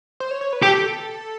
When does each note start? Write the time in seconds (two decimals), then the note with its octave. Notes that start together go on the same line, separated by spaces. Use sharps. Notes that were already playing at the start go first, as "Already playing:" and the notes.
0.20 C5
0.31 C#5
0.41 C#5
0.53 B4
0.63 G4 A4